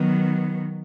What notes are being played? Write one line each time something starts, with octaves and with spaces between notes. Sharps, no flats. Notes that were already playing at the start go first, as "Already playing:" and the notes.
Already playing: D#3 F#3 B3